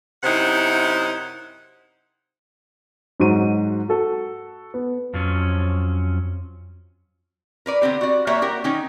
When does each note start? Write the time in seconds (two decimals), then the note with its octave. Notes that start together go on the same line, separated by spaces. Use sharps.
0.24 F#2 C3 D#4 E4 C5 F#5
3.20 G#2 F#3 D#4 F#4 C5 D#7
3.89 F#4 A4
4.74 B3
5.14 F2 F3 F#3 C#4
7.66 A#4 B4 D5
7.82 D3 B3 C4 G4
8.01 F#4 D5
8.27 G3 A#3 F#4 C#5 E5
8.42 F#4 G4 A#4
8.64 D#3 C#4 D#4 C#5